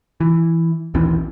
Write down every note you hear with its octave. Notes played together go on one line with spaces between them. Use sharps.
E3
A#1 D#2 E3 C4